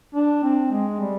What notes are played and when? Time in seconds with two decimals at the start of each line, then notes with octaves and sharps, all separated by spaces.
0.15 D4
0.43 C4
0.72 G#3
1.01 G3